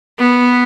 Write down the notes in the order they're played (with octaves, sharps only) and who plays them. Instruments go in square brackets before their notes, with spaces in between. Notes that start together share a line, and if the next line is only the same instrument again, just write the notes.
[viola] B3